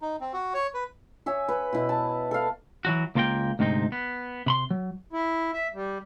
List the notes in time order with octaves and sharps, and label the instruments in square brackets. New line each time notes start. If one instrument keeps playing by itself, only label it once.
[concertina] D#4
C4
F#4
C#5
B4
[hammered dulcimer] C#5 E5 G#5
B4
B2 E4
A5
A4 F5
[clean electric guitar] E3 F#3 F#4
C#2 A#3 F4 A#4 G5
D2 G#2 C3 C4 D#4
B3
C3 B5 C6
F#3
[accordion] E4
E5
G3